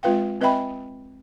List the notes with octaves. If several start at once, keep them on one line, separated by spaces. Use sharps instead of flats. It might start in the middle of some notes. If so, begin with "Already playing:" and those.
G#3 C4 F4 B4 F5 G5
C4 B4 D#5 E5 G5 B5